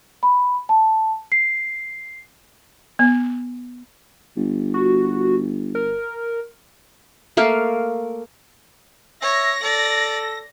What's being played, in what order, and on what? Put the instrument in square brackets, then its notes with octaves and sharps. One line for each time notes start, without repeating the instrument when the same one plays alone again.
[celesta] B5
A5
C7
[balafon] B3
[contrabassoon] G1
[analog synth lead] F#4
A#4
[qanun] A3 A#3 F5
[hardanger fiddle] C#5 [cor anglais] E5 [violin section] A#6
[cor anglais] A4 [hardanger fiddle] D5